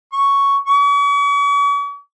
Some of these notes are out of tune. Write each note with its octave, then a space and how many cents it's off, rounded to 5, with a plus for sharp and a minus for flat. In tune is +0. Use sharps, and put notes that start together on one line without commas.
C#6 +5
C#6 +45